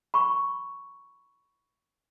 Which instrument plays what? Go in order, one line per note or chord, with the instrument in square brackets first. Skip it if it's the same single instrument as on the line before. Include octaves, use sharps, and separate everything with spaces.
[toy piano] B5 C#6